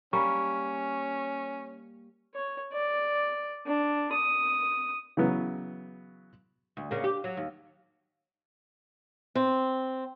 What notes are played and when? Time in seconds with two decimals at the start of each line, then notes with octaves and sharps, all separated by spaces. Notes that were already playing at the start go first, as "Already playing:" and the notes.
0.13 G3 A#3 C#4 C#6
2.34 C#5
2.73 D5
3.66 D4
4.12 D#6
5.17 C#3 E3 F#3 B3
6.77 D2
6.91 D2 C#3 A#3
7.04 G4
7.24 F#3
7.37 D#2
9.35 C4